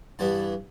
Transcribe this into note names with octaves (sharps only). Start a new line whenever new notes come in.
G2 E3 G3 B3 A5